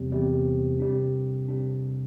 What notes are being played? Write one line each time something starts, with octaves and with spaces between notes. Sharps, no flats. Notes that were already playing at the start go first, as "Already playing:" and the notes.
Already playing: E2 C3 G3
E2 C3 G3
C3 G3 D4
C3 G3 D4